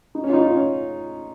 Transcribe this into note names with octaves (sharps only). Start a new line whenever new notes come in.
D#4
C#4
F4
D#4
F4
C#4